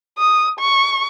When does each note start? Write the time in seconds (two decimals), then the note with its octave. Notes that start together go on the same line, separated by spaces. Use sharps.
0.18 D#6
0.59 C#6